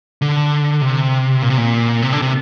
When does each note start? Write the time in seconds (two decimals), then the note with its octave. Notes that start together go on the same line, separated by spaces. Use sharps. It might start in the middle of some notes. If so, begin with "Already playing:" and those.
0.22 D3
0.82 C3
1.42 A#2
1.50 C3
1.57 A#2
2.02 C3
2.13 D3
2.22 C3